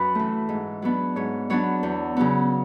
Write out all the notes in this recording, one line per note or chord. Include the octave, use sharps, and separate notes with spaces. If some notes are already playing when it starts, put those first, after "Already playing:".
Already playing: F#2 B4
E3 A3
G#2
F#3 B3 D4
G#2 C#5
F#3 B3 D4 C#5
E2
C#3 F#3 B3